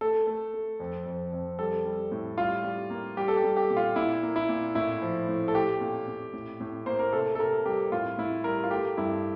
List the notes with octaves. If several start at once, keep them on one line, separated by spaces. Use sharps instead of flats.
A3 A4
A3
A3
F2
F2
F2
G3 A4
G3
A2
G3 F4
G3
A#3
G3 G4
A4
G4
G3
G4
A#2
F4
A#2 E4
A#3
E4
A#2
A2 E4
F3
A2
A4
A3 G4
A#2
A#2
A2
A2
A#3 C5
A#4
C3 A4
A4
C3 A#4
G3 G4
A2 F4
A2 E4
G3 A#4
F4
A3 G4
G2 E4